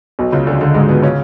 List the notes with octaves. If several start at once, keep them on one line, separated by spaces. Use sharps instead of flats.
B1 B2
C#2 C#3
D2 D3
D2 D3
G#2 G#3
B2 B3
C#3 C#4